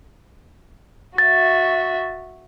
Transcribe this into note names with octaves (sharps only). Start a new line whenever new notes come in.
F#4 E5 A6